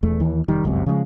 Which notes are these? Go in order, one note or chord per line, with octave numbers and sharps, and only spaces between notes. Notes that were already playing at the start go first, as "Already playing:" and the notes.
E1 E2 A3
D#2 E3
F1 D#3 G3
G1 C#2 F#2 C3
C#3 F3 F#3 G#3